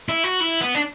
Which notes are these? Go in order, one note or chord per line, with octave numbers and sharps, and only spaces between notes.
E4
F#4
E4
B3
D4